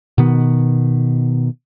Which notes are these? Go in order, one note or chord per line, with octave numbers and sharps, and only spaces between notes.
B2 D#3 B3